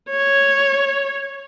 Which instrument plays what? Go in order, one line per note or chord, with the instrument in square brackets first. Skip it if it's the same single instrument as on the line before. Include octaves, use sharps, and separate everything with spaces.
[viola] C#5